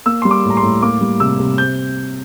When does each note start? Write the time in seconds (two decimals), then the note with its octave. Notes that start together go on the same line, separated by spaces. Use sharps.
0.06 A#3 E6
0.22 G3 C6
0.31 D6
0.45 A2
0.50 A#5
0.57 C6
0.62 A2
0.82 A#3 D6
1.01 G3
1.20 C3 E6
1.40 C3
1.58 C4 G6